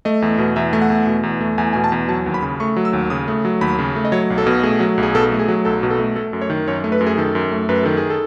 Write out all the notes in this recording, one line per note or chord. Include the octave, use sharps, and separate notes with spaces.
A3 D#5
E2
B2
E2 E5
A3
F#5
E2
B2
E2
A3
E2 G#5
B2 G#5
A5
E2
F#3 A5
D#2
B5
C#3
A3 C#6
F#3
E6
D#2
C#3 D#6
A3
F#3
D#2 B5
C#3
A3
D#5
F#3 C#5
B1
A4
B2
A3 G#4
F#3
B1
G#4
B2 A4
A3
G#4
F#3
B1 A4
B2
A4
A3
A3 A4
F#2
C#5
D#3
F#2 C#5
A3
B4
F#2
G#4
D#3 A4
F#2
A3
F#2 B4
D#3 A4
G#4
A4